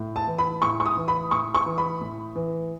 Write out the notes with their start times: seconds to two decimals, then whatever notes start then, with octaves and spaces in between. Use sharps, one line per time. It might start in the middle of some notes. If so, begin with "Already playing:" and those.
Already playing: A2
0.16 A5
0.27 E3
0.38 B5
0.62 A2 C#6
0.80 C#6
0.85 D#6
0.97 E3
1.08 B5
1.31 A2 C#6
1.54 C#6
1.66 E3
1.78 B5
2.01 A2
2.35 E3